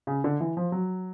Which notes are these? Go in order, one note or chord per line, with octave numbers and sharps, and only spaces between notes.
C#3
D3
E3
F3
F#3